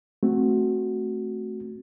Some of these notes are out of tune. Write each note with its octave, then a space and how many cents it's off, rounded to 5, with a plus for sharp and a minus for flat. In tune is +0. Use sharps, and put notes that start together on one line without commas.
A3 +0 C4 +0 F#4 +0